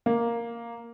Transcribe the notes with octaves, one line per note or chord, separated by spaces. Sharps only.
A#3